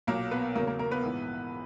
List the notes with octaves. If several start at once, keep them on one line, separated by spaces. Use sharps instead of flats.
B1 A#2 F#3 A#3 A#4
B3 B4
E2 C#3 F#3 A#3 A#4
A#3 A#4
A#3 A#4
B3 B4
A#1 G#2 E3